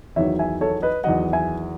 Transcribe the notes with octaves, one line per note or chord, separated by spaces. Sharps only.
E2 D#3 F#3 C#5 E5
E5 G#5
A4 C#5
B4 D#5
E2 D#3 F#3 D#5 F#5
E5 G#5